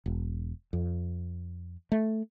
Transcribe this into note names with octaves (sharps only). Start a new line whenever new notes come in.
E1
F2
A3